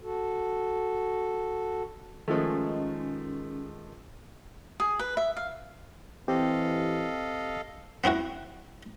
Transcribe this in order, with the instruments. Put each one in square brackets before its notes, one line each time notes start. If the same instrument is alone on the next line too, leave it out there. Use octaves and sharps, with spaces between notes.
[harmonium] F#4 A4
[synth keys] D#3 G#3 [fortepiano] F3 A3 [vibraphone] C#4
[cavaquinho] G#4
B4
E5
F5
[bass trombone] E3 [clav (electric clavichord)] C4 [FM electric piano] G4 [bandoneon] A4 D#5 F5
[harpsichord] B3 C4 E4 F#4